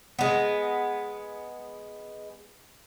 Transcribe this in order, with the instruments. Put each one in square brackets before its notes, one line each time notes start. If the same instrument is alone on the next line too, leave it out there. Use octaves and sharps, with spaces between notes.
[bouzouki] G#3 B3